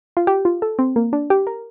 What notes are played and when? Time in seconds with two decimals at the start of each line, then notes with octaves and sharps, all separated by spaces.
0.17 F4
0.27 G4
0.45 F4
0.62 A4
0.79 C4
0.96 A#3
1.13 D4
1.30 G4
1.47 A#4